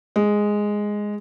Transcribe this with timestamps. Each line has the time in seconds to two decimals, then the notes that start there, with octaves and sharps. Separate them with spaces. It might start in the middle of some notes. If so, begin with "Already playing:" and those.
0.16 G#3